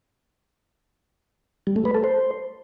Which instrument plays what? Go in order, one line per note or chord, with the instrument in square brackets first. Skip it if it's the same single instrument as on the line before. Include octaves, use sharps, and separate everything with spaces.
[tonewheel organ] G3
A3
B4
A4
C5